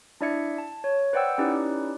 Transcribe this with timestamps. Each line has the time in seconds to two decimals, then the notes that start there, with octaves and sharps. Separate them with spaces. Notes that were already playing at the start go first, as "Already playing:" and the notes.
0.21 D4 E4 D5 E5 G#6 C#7
0.58 A5
0.84 C#5
1.13 B4 C5 D5 F#5 G5 E6
1.38 C#4 D#4 E4 G4 B4 D5